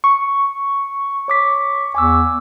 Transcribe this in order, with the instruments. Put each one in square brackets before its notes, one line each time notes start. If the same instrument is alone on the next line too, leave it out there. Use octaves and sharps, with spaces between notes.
[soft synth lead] C#6
[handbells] C#5 D6 B6
[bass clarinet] E2 [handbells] G#5 D6 E6